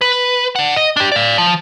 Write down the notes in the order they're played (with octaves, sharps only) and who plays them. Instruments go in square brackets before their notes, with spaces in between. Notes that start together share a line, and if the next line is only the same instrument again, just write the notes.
[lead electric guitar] B4
D5 F#5
D#5
D4 G4
D5 F5
F3